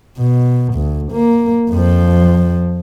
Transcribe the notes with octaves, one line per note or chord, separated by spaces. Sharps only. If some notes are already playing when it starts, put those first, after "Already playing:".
B2
D2
A#3
F2 F3